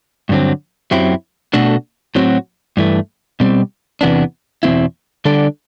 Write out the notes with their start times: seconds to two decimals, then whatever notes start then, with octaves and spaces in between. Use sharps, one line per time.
0.29 G2 D3 F#3 C4
0.91 F#2 F#3 C4 E4 G4
1.53 B2 A3 D4 F#4 A4
2.15 A2 F#3 C4 F#4
2.77 G2 E3 A3
3.40 B2 G3 C4
4.01 E2 C3 E3 B3 D4
4.63 E2 B2 G3 C4 E4
5.25 D3 G3 D4 A4 D5